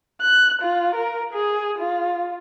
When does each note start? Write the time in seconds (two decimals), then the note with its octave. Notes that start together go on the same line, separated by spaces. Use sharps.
0.21 F#6
0.62 F4
0.95 A#4
1.33 G#4
1.78 F4